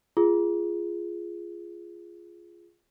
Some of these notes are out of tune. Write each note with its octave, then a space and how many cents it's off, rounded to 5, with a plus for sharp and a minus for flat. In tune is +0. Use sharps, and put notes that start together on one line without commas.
F4 -20 G#4 +0